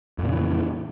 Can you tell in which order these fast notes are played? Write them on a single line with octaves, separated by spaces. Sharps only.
F2 A#2 C#3 E3